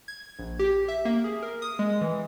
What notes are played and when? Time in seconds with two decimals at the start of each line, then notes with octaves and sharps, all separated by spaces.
0.08 G#6
0.39 A#1
0.59 G4
0.88 E5
1.05 A#3
1.24 G#4
1.42 A#4
1.62 D#6
1.79 G#3
2.01 E3